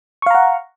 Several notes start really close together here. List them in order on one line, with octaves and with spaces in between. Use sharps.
C#6 F5 A#5 F#5